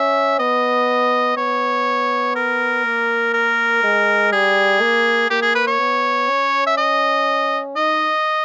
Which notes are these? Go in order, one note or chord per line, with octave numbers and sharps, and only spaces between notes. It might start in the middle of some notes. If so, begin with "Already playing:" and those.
Already playing: C#4 E5
B3 D#5
B3 C#5
A#4
A#3
A#4
G#3
G3 G#4
A#3
A#3 G4
G#4
B4
C#5
B3
C#4
E5
D#5
D#4 D#5